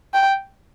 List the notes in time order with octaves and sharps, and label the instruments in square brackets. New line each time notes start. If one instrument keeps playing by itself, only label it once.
[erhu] G5